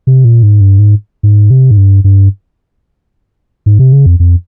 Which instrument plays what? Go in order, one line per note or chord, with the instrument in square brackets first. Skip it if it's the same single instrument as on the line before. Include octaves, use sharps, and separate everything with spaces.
[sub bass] C3
A#2
G#2
G2
G#2
G#2
C3
G#2
G2
G2
G#2
C3
C#3
F2
F2